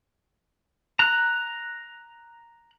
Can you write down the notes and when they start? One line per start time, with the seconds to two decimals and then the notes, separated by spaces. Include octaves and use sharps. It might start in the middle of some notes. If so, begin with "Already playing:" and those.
0.99 A#5 F#6